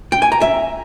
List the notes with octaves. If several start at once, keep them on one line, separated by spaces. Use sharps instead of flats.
G5
G#5
A#5
E5